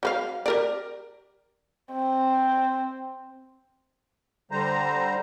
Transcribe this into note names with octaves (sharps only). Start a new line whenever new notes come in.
F#3 B4 F5
G4 A#4 D5
C4
D3 G3 C5 A#5